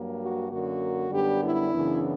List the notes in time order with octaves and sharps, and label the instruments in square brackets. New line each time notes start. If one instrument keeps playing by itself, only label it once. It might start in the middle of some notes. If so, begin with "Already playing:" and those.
Already playing: [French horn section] G2 F#3 A#3
F#4
F#2 D3 A#3 F#4
F#2 D3 G3 B3 D4 G4
E4
F#2 C#3 E3 B3 D4